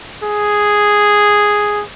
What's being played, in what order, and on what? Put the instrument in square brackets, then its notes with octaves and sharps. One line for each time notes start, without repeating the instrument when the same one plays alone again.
[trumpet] G#4